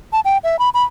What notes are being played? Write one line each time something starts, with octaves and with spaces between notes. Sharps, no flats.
A5
G5
E5
B5
B5